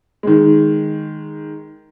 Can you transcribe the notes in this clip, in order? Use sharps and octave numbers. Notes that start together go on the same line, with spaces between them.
D#3 G#3